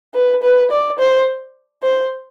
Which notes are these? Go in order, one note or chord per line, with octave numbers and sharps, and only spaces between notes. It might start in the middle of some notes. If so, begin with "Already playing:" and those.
B4
B4
D5
C5
C5